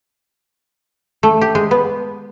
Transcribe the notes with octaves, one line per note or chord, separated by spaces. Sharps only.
A3
G4
G#3
B3